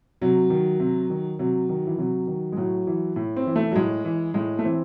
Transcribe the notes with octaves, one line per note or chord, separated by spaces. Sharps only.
C3 F#3
D#3
C3
D#3
C3 F#3
D#3
E3
C3 F#3
D#3
G#3
A2 F#3
E3
A2
C4
E3
A3
F#3
A2 G#3
E3
A2 G#3
A3
E3 C4